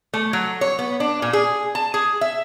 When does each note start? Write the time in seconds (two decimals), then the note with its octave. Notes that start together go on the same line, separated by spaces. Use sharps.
0.14 A3
0.33 F#3
0.61 C#5
0.79 B3
1.00 D4
1.22 A#2
1.33 G#4
1.75 A5
1.94 G#4
2.21 E5